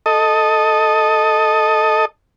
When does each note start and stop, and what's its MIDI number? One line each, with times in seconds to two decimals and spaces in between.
0.06 2.05 69
0.06 2.05 75